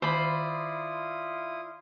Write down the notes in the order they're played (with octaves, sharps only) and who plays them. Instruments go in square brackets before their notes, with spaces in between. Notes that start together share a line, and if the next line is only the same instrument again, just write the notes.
[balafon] D#3 [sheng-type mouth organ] E4 F4 D#6 [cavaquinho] C5 D5 B5